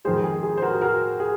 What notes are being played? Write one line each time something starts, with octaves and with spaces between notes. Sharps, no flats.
F2 D#3 G#3 G#4 C5
G#4
G#4
C5
F#4 A#4
G#4
F#4 A#4
G#4